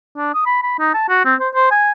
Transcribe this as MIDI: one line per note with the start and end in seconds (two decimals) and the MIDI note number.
0.17 0.32 62
0.34 0.41 87
0.46 0.59 83
0.63 0.78 83
0.79 0.90 63
0.94 1.04 81
1.09 1.22 66
1.25 1.35 60
1.40 1.49 72
1.54 1.71 72
1.71 1.92 80